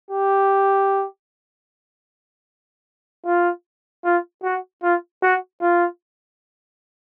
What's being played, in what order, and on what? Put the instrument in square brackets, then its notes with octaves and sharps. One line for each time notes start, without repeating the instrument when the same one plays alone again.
[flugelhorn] G4
F4
F4
F#4
F4
F#4
F4